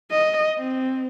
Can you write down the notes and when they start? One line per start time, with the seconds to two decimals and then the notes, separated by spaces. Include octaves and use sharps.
0.10 D#5
0.58 C4